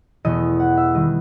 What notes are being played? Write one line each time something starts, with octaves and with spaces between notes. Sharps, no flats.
E2 B2 A3 D#5
F#5
E5
D#3 G3 D#5